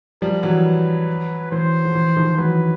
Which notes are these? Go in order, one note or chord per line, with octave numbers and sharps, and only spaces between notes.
F3 G3 A#4
E3 F#3
B4
E3 C5
F3
E3
D#3 F3
E3 F#3 B4